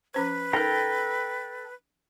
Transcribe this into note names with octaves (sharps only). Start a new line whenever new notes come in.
F3 C#4 B4 C5
D#4 A4 A#4 G5 A#5